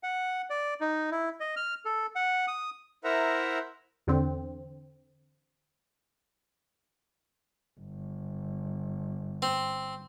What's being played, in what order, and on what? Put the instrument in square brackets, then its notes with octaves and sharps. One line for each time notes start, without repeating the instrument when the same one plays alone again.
[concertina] F#5
D5
D#4
E4
D#5
F6
A4
F#5
D#6
[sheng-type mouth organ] E4 A#4 C5 E5 F#5 A#5
[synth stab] E2 D3 C4
[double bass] G1
[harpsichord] C4